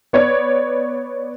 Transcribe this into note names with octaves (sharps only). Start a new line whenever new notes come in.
B3 C#5 D5